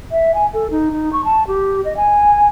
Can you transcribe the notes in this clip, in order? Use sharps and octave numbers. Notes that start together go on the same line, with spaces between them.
E5
G#5
A4
D#4
D#4
C#6
A5
G4
D#5
G#5